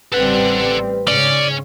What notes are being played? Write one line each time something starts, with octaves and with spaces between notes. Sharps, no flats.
A1 G3 C4 A4 B4 F#5
G#2 C#3 C#4 D5